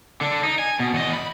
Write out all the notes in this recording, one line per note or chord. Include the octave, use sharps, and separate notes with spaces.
D3 D4
D#4
G#5
B2
E2 D#5
B5